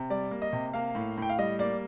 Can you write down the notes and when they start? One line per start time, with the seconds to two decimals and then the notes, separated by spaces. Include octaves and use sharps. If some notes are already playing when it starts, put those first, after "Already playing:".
Already playing: C3
0.10 G3 D5
0.31 A#3
0.42 D#5
0.53 C3
0.73 A#3 F5
0.95 A2
1.17 A2 G5
1.29 F5
1.38 G3 D#5
1.59 A#3 D5